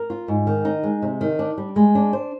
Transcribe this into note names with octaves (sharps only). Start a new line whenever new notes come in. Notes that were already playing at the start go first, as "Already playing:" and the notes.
Already playing: A#4
F4
G#2
D#3
D#4
G#3
C3
D#3
D4
G3
G#3
D4
C5